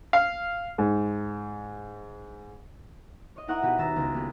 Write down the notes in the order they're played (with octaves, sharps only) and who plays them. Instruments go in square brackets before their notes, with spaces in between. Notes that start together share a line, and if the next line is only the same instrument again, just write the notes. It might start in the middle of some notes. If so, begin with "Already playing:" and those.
[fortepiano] F5
G#2
[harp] C#5 D#5
D#4 E4 A#4 F#5 C#6 D#6
B2 F#4 G4 B4
D#1 A#5 E6 A6 B6
C#2
A#3 B3 G4